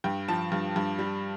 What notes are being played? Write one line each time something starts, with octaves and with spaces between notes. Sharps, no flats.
G2 G5
F3 A5
G2
G2
G3